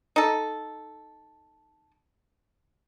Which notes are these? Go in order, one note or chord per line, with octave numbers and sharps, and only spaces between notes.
D#4 A4